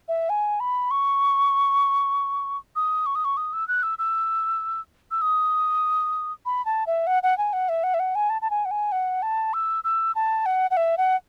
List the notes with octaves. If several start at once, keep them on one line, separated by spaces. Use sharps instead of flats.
E5
G#5
B5
C#6
D#6
C#6
D#6
C#6
D#6
E6
F#6
E6
E6
E6
D#6
B5
A5
E5
F#5
F#5
G#5
F#5
E5
F#5
E5
F#5
G#5
A5
A5
G#5
F#5
G#5
F#5
A5
E6
E6
A5
F#5
F#5
E5
F#5